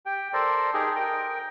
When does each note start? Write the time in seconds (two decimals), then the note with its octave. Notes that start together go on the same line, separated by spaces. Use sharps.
0.06 G4 G5
0.33 A4 A#4 C5 D5
0.74 D#4 G4 G#4 A#4
0.95 A#4 G5